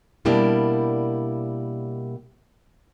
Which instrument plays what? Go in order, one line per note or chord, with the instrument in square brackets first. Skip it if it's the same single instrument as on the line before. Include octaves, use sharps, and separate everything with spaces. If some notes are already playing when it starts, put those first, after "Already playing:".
[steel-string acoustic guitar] B2 G3 A#3 D4 E4 G4